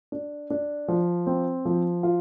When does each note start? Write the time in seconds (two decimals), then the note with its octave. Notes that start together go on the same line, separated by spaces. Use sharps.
0.12 D4
0.50 D4
0.88 F3
1.27 C4
1.65 F3
2.03 F4